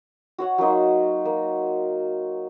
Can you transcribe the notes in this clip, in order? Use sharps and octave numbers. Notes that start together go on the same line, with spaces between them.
F#4 C#5 F#5
F#3 A#3 D#4 C6
A#3